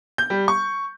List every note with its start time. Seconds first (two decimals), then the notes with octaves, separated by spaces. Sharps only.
0.18 G6
0.30 G3
0.48 C#6